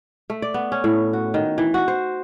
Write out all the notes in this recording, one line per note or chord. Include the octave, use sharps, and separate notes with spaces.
A3
D5
B3
C#4
A2
F#4
D#3
E3
F#4
C5